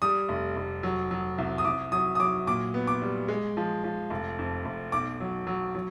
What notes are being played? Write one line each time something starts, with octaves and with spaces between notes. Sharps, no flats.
G3 D#6
F1
F1
F#3
F#3
C2
D#6
C2 D6
F#3 D#6
D#6
F#3 D6
A#2 D6
B3
D6
G3
G#3
F3
F3
F1
F2
F1
B1 D6
F#3
F#3
F#3